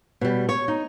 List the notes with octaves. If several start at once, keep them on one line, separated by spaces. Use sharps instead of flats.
B2 G3
C#5
D#4